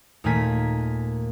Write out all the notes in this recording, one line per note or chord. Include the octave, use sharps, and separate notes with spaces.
D#2 A#2 A3 A#3 G#5 B6